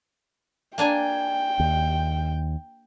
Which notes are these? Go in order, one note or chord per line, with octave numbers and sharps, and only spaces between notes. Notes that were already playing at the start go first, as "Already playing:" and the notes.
A#3 D4 G5 G#5
D#2